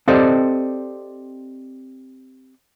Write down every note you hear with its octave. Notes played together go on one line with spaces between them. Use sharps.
C4 G4 A4 C5 D5 D#5